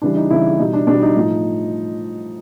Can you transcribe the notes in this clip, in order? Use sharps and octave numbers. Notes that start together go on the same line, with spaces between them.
C#3 E3 G3 D4
D#4
C#3 E3 G3 E4
B2 G3 D#4
D4
B2 G3 D4
D#4
A2 F3